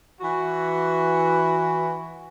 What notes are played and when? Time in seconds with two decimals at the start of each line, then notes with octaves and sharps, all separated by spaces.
0.21 E3 F#4